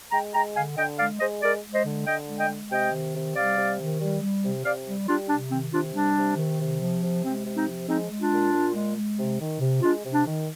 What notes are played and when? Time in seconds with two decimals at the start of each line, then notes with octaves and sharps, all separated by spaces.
0.12 G#3 G5 A#5
0.34 G#3 G5 A#5
0.55 D3 F5 G#5
0.76 D3 D#5 G5
0.98 G#3 D5 F5
1.20 G#3 C5 D#5
1.42 G#3 A#4 D5
1.62 G#3
1.74 C5 D#5
1.85 D3
2.06 D3 D#5 G5
2.27 G#3
2.39 D#5 G5
2.49 G#3
2.71 C3 D#5 G5
2.92 D#3
3.14 C3
3.35 G3 D5 F5
3.57 C3
3.79 D#3
4.01 G3
4.21 G3
4.43 C3
4.64 C3 D5 F5
4.87 G3
5.08 G3 D4 F4
5.29 C3 D4
5.51 D#3 C4
5.72 C3 D4 F4
5.94 G3 D4
6.16 C3
6.37 D#3
6.59 C3
6.81 F3
7.02 C3
7.23 G#3 C4
7.45 C3
7.56 C4 D#4
7.67 F3
7.88 G#3 C4 D#4
8.10 G#3
8.20 D4 F4
8.32 A#2
8.52 A#2
8.74 G#3
8.96 G#3
9.18 C3
9.40 D#3
9.60 C3
9.82 G#3 D4 F4
10.03 C3
10.14 D4
10.26 D#3